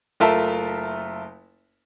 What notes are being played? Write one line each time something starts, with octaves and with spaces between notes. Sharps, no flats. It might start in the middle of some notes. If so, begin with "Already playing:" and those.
F#1 A3 F4 A#4 E5 A5